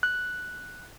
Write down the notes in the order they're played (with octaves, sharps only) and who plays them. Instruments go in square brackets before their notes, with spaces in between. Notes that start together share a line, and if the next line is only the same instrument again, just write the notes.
[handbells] F#6